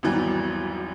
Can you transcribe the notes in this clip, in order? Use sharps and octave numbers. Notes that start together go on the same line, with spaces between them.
G#1 E2 E3 F#3 G3